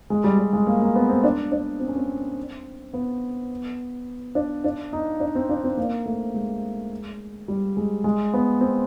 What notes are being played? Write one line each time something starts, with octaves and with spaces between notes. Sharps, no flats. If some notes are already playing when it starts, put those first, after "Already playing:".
G#3
G3
G3
G#3
A#3
A#3
B3
C4
D4
D4
C4
C#4
C4
B3
D4
D4
D#4
D4
C4
D4
C4
A#3
A3
G#3
G3
G#3
G#3
B3
C4